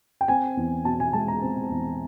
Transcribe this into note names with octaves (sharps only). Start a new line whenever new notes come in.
G5
C4 G#5
E2
B2 A5
G#5
G#3 A5
A#5
C4
E2